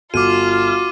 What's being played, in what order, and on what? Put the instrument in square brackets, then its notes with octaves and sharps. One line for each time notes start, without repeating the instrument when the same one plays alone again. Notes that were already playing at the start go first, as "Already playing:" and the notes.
[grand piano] G1 [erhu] F4 [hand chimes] F#4 [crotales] D6 F6 D#7